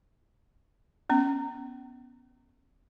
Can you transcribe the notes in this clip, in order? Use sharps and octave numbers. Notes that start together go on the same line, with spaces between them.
B3 C#4